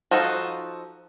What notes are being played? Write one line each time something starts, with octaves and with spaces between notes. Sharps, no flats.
F3 D#4 F#4 A4 F5